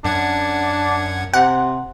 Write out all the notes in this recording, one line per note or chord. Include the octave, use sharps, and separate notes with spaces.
F#2 D4 F#5 G#6
C3 F#5